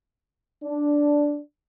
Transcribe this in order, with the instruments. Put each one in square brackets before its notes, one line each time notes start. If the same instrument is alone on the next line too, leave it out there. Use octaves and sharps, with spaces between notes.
[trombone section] D4